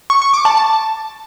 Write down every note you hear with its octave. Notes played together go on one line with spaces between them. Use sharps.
C#6
C#6
D6
A5
A5